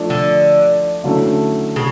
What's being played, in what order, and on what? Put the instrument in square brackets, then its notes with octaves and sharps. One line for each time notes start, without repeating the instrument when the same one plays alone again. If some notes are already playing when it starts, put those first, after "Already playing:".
Already playing: [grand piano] F3 A3 D4
[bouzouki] D3
[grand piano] D3 F#3 A3 C#4 E4
[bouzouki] C#3